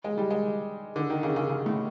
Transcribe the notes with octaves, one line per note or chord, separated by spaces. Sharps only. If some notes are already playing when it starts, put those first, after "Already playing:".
G#3
G3
G#3
D3
D#3
C#3
C#3
C#3
A2